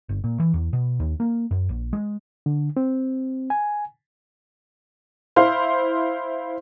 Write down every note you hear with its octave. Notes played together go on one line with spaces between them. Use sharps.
G1
A#2
E3
E2
B2
D#2
A#3
F#2
A#1
G#3
D3
C4
G#5
E4 C5 F5 C6